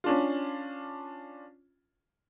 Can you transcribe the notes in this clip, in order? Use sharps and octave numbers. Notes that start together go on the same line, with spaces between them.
C#4 D4 F4